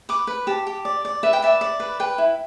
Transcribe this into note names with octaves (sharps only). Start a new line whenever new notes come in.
B4 D6
B4 B5
G4 A5
G4
D5
D5
B4 E5
G5
D5 E5
D5
B4
B4 G5
E4